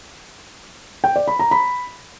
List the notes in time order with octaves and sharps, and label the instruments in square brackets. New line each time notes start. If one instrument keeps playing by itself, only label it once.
[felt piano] G5
D5
B5
A#5
B5